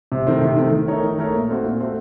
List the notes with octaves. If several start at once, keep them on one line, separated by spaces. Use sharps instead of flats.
C3
D#3 A3 C4
C3
D#3 A3 C4
D#3
A3 D#4 A#4 C#5
D#3
A3 D#4 A#4 C#5
A#2
A3 C4 F#4
A#2
A3 C4 F#4